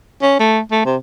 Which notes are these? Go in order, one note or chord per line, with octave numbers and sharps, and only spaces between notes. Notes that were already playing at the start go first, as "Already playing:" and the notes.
C#4
A3
A3
C3